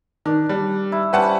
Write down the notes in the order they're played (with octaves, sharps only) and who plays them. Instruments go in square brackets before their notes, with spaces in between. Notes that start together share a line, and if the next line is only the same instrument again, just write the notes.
[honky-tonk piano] D#3 [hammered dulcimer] D4
[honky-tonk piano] G3
[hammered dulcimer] E4
[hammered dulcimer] G3 C#4 C5 [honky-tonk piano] B4 F#5 A5